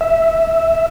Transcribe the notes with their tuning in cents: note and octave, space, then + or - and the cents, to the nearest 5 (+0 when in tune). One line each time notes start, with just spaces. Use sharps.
E5 +0